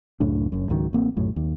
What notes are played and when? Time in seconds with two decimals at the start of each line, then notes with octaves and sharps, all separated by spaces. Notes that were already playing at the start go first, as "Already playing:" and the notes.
0.20 C#2 F#2 A2 D4
0.52 F#1 F#2
0.69 C#2 G#2 D#3 F#3
0.93 A1 A#3 C4
1.17 B1 F#2 A2
1.36 D#2